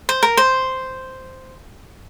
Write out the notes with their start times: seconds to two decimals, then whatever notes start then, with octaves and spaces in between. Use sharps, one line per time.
0.09 C5
0.23 A#4
0.37 C5